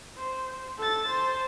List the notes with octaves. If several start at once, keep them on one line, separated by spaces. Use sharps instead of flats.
C5
A4 A6
C5